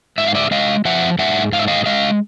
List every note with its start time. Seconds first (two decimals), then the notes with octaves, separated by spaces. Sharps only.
0.18 G#2 E5
0.27 F5
0.35 D5 E5
0.51 G#3 D#5 F5
0.85 F3 E5 F#5
1.19 G#2 E5 F#5
1.52 G#2 F5
1.59 E5
1.68 D#5 F5
1.86 G#3 D#5 F5